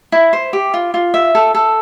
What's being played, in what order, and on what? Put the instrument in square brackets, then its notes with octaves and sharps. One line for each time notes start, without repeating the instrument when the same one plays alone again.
[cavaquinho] E4
C5
G4
F4
F4
E5
A4
A4